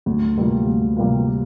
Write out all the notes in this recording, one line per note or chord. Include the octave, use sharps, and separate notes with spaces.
D2
C3 G3 A#3 F4
D2
C3 G3 A#3 F4